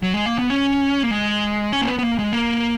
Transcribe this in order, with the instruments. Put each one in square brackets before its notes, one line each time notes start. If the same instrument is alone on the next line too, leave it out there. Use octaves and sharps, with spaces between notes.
[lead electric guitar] F#3
G#3
A#3
B3
C#4
A#3
G#3
C#4
A#3
B3
B3
A#3
G#3
A#3